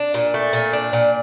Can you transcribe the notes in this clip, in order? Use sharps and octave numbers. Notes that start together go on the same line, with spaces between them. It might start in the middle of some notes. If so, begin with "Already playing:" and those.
Already playing: D4
A#2
A3
A#2
D4
A#2